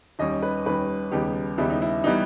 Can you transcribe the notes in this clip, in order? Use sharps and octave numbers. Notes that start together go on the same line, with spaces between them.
D#2 D#3 G3 C#4 D#5
B4
D#2 D#3 G3 C#4 B4
D#2 C#3 G3 B3 D#4 G4
D#2 C#3 G3 B3 D#4 E4
D#4
E4
E3 G3 B3 D#4